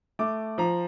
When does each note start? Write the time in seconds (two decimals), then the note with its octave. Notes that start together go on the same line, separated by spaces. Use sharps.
0.19 A3 D6
0.58 F3 A#5